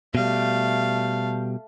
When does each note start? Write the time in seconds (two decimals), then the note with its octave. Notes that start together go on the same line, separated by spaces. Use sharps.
0.15 B2 G3 A3 F5